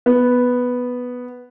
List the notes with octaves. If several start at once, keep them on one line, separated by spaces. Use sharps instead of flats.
B3